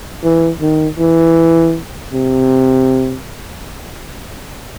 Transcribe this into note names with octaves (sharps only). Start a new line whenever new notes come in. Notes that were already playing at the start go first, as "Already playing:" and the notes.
E3
D#3
E3
C3